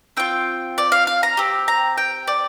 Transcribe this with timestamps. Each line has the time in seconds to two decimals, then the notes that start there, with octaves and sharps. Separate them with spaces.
0.17 C4 F4 G5
0.78 D5
0.92 F5
1.07 F5
1.23 A#5
1.37 C4 G4
1.68 A#5
1.98 G5
2.27 D5